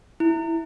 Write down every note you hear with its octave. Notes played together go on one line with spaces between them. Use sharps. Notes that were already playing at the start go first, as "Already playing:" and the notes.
E4